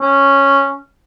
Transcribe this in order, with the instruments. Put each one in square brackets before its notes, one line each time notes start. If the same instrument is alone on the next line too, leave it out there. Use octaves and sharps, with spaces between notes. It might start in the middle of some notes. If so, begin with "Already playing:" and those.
[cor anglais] C#4